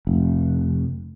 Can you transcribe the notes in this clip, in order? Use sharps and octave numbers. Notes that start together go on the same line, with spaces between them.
F1